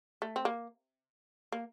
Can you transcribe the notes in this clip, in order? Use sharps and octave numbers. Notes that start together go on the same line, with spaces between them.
A3
C4
A#3
A#3